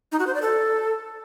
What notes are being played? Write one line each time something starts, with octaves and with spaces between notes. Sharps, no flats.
D#4
F#4
C5
D5
A4